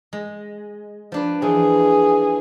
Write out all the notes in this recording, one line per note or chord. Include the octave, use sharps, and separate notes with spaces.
G#3
F3 D4 B4
E3 F3 G#4